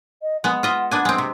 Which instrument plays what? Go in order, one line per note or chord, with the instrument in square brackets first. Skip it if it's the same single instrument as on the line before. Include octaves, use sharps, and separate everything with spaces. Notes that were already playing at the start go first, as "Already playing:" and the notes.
[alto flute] D#5
[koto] G#3 B3 [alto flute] F#5
[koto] F4 D#5 E5
B3 D4 G#5
G#3 C4
C3